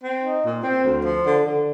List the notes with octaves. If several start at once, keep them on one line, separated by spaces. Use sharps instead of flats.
C4
D#4
A#2
C4
D2
F3
D3
D3